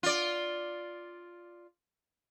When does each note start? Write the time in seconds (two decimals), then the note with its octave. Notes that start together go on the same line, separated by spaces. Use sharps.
0.03 F4 D5